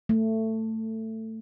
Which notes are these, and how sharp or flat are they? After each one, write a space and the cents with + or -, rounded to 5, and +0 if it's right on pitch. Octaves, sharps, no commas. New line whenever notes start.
A3 +15